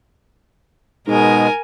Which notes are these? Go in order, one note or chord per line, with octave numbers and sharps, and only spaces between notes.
G#2 B2 G#3 A#4 G#5